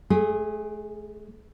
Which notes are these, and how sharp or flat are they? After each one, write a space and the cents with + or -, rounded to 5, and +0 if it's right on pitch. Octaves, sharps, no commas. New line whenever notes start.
A3 -40 G#4 -10